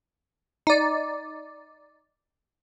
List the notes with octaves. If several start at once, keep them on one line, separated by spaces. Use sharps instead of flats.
D#4 D5